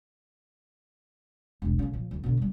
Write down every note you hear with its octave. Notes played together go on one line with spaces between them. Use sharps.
E1 C2
C#3 B3
A#2 F3
D2 E3
B2 D3
G1 G3